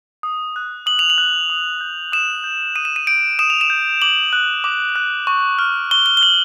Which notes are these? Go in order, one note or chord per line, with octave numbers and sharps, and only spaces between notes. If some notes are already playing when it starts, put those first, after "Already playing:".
D#6
F#6
D#6 F#7
F7
F#7
F#6
D#6
G6
D#6 E7
G6
D#6 D#7
E7
D#7
G6 D7
D#6 E7
F7
E7
G6
D6 F#7
F#6
D6
F#6
C#6
F6
C#6 G7
G7
G7
F6 F#7